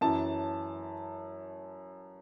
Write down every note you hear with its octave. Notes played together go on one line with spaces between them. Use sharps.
F#2 E3 A5